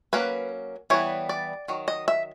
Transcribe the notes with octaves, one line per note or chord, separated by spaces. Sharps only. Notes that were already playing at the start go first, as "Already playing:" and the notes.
F#3 A#3 C#4 B4
E3 G3 B3 C#5
D5
D#3 F#3
D#5
E5